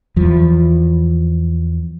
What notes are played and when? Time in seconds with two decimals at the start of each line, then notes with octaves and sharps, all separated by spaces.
0.16 E2 F3